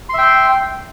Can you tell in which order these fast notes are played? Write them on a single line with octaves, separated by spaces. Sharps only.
C6 E5 G5